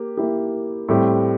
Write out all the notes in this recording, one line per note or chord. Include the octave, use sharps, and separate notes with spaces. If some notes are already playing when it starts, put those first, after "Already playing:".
Already playing: A#3 G4
A#3 E4 G4
A2 G3 C4 G4